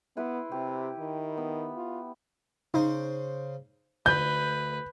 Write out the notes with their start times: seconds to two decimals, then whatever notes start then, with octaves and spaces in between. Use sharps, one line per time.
0.17 B3 E4 B4 C6
0.52 C3 G4
0.99 D#3
1.38 B3
1.76 F4
2.74 C#3 D#4 C5
4.06 D2 B4 G6